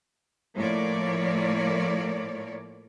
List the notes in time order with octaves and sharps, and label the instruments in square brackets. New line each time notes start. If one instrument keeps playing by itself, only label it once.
[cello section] A2 F3 A#3 C#5 D5